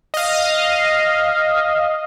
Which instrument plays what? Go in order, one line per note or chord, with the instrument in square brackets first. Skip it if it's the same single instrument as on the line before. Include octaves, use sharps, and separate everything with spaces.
[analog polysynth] D#5 F5